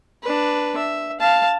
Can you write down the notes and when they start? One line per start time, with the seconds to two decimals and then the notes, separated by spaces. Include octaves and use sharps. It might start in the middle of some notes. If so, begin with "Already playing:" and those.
0.23 D4 B4
0.78 E5
1.20 F5 A5